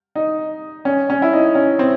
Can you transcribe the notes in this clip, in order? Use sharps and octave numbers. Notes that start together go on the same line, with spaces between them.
D#4
C#4
C#4
E4
D#4
C#4
C4